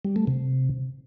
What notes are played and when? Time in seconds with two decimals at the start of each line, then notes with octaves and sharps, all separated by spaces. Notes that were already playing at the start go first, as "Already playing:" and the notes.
0.05 G3
0.16 A3
0.27 C3